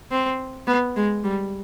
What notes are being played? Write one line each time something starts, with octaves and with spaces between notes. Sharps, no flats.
C4
B3
G#3
G3